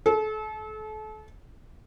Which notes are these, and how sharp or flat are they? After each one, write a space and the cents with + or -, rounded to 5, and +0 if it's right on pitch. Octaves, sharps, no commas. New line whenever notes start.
A4 -35